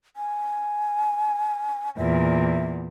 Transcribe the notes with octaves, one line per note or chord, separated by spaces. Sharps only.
G#5
E2 A#2 E5